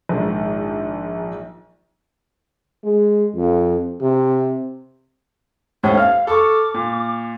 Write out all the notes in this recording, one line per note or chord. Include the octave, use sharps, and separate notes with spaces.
A#1 G#2 D#3
G#3
F2
C3
D#2 A2 C#4 C5
F5 F6
A4 C#6 D6
A#2